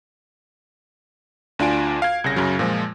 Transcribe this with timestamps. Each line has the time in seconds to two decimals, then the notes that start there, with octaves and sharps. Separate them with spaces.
1.59 D2 D4 F4 G#5 D7
2.02 F5 G#6
2.24 C2 C#3 A#6
2.36 F#2 C#3 F#3
2.59 A#2 F3 G#3